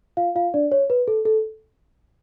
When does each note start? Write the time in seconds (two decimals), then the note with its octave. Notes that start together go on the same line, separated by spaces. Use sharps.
0.17 F4 F5
0.36 F4 F5
0.54 D4 D5
0.72 C#5
0.90 B4
1.08 A4
1.25 A4